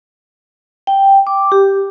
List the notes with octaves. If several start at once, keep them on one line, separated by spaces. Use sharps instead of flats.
G5
D6
G4